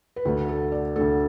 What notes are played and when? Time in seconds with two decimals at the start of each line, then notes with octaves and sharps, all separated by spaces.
0.16 B4
0.25 D2 D3 A3 A4
0.49 A4
0.72 D5
0.96 D2 D3 A3 A4